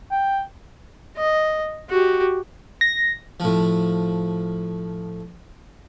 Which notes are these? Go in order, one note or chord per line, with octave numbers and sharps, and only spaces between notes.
G5
D#5
F#4 G4
A#6
A2 F3